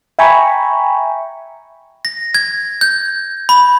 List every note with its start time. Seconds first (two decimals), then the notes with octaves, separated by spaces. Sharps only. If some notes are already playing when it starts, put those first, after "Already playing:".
0.19 E5 G5 G#5 A#5 B5 C#6
2.05 A#6
2.34 G#6
2.81 G6
3.49 B5